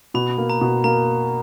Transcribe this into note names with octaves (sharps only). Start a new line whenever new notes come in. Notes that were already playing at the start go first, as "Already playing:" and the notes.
B2 B5
A#3
A#5
B2
A#3 A#5